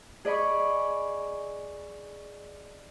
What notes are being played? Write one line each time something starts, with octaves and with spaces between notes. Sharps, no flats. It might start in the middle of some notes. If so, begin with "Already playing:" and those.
G#4 D5 D#5 B5 C#6